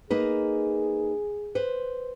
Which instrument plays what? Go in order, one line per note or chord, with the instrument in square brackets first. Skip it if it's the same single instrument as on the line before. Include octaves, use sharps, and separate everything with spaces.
[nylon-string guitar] A#3 D#4 B4 [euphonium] G#4
[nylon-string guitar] B4 C5